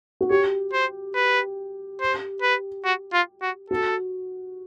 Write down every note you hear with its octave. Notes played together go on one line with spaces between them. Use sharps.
F#4
G4 C#5
C5
B4
C5
B4
F#4
F4
F#4
F#4 A4